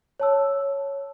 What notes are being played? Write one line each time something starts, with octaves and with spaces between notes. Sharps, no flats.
C#5 A5 E6